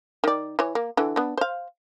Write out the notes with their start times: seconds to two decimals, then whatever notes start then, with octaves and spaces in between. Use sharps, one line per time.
0.24 D#3 D5
0.59 E3 C#5
0.75 A#3
0.97 D3 E3
1.16 B3 D4
1.37 C5 F5